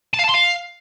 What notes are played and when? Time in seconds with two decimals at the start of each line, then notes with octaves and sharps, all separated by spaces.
0.14 A5
0.19 F5
0.24 A5
0.30 C6
0.35 F5